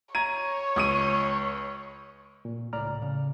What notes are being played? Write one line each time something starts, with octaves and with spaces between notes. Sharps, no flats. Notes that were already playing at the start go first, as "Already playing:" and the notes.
C#5 A#5 G#6 D#7
C#2 D#6 D#7
A#2
C#2 A2 D5 A#5 F6
C#3